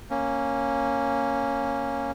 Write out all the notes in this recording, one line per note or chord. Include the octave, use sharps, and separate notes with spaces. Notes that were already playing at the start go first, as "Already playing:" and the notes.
A#3 C#4